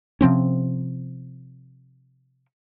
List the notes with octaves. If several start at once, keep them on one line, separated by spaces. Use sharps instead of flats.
C3 F3 C4 C#4